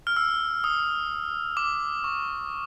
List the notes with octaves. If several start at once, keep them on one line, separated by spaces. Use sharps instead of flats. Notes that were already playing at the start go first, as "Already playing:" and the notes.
F6
E6
D#6
D6
C#6